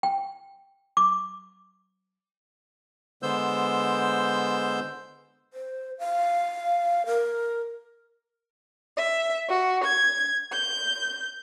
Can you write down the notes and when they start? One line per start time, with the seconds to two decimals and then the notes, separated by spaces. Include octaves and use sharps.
0.03 G5
0.97 D6
3.23 D3 G#3 B3 C5 E6 G6
5.54 C5
5.99 F5
7.07 A#4
8.97 E5
9.48 F#4
9.85 G#6
10.52 G6